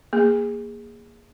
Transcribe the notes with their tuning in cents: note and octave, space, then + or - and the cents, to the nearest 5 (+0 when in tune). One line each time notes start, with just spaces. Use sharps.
A#3 +0 G#4 -15